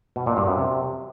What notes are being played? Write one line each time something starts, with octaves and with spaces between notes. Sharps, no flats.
B2
A#2
G2
F#2
C3